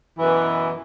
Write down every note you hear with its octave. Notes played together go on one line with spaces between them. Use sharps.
F#2 B2 E3